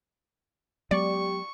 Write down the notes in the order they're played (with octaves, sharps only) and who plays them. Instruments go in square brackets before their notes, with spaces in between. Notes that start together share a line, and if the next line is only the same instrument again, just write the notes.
[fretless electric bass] F#3 G#3 B3 [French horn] G4 [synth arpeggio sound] D5 [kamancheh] C#6